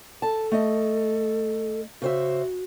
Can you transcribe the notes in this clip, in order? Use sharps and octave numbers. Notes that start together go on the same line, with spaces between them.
A4 A5
A3 D#5
C#3 F#4 C5 E5